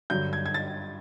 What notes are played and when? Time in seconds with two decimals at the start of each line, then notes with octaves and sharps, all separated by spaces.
0.10 G2 D3 F#3 G6
0.33 G#6
0.46 G#6
0.54 A6